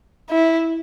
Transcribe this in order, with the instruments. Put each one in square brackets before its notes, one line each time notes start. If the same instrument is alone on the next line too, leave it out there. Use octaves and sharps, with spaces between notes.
[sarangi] E4